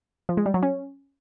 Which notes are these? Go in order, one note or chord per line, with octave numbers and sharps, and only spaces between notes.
F3
G#3
G3
F#3
C#4